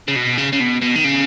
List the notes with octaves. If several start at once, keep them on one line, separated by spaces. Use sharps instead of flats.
C#3
B2
C#3
C#3
B2
B2
D#3
C#3